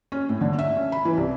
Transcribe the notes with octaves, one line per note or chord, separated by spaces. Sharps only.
C#4
A2
D3
E5
C#4
B5
E3
C2